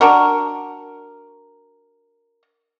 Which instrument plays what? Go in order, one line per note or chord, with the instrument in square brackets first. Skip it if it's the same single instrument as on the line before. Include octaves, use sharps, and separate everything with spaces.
[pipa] D4 F#4 A#4